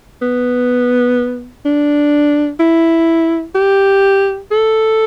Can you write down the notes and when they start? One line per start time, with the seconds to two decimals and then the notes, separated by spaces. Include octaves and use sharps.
0.22 B3
1.65 D4
2.60 E4
3.55 G4
4.51 A4